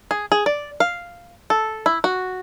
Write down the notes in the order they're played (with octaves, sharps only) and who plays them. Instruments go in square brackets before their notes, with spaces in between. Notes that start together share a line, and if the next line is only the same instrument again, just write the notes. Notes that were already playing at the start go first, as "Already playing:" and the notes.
[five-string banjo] G#4
G#4
D5
F5
A4
E4
F#4